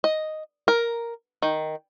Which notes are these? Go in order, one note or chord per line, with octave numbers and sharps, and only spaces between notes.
D#5
A#4
D#3